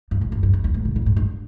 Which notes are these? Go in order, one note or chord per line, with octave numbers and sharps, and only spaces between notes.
G2
G#2
G2
G2
G2
E2
G#2
C#3
A#2
G#2
G2